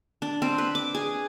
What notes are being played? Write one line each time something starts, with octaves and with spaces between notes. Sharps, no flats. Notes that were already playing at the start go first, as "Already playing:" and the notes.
D4
C4
B4
D6
G#4